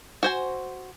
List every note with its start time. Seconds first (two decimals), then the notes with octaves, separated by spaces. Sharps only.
0.23 F#4 C5 G#5